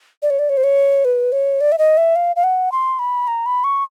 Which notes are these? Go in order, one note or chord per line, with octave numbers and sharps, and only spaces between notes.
D5
C#5
D5
C#5
C5
C#5
B4
C#5
D5
E5
D#5
E5
F5
F5
F#5
C6
B5
A#5
B5
C#6